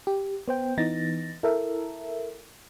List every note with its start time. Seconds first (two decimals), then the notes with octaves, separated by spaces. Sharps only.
0.07 G4
0.48 B3 C5 G5
0.78 E3 B3 D#4 A6 A#6
1.43 E4 A4 A#4 E5